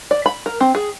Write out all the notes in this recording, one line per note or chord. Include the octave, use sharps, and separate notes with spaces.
D5
B5
A#4
C4
G#4